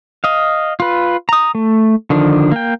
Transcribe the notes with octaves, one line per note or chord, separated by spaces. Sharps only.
D#5 F5
F4 B4
A#5 D#6
A3
D3 D#3 F3 D4
A#3 G5